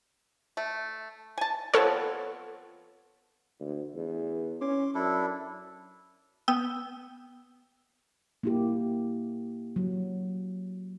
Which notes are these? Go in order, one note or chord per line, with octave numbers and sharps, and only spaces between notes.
A3
G#5 A5
F3 B3 C4 A4 C#5
D2
E2
C#4 C6 D6
F#2 D4 E4 A4
B3 G5 D#6 E6
A#3 E4 G4
F#3